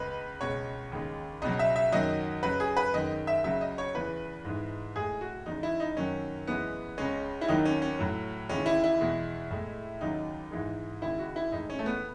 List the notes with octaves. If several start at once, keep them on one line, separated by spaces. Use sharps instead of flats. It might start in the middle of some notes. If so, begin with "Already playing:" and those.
Already playing: C#2 C#3 G#3 B4
C#2 B2 G#3 C#5
D#2 C#3 G#3
C#2 B2 F#3 D#5
E5
E5
F#2 D#3 F#3 D#5
F#2 C#3 F#3 B4
G#4
B4
F#2 D#3 G#3 D#5
E5
C#2 C#3 F#3 E5
D#5
C#5
E2 C#3 E3 B4
G#2 E3 G#3
A2 G#3 G#4
F#4
E2 C#3 G#3 D#4
E4
D#4
F#2 D#3 F#3 C#4
F#2 E3 G#3 B3
C#2 C#3 G#3 C#4
E4
D#2 D#3 F#3 D#4
C#4
C#4
A2 F#3
D#2 C#3 E3 G#3 C#4
E4
E4
E2 B2 G#3
A2 G#3
D#2 C#3 F#3 D#4
G#2 E3 G#3
D#2 C#3 G#3 E4
F#4
E4
A2 E3 G#3 D#4
C#4
A3
B3